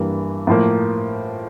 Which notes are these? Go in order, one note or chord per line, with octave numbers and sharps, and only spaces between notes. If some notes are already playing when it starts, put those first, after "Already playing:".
Already playing: G2 E3 G3 A#3
A2 F3 A#3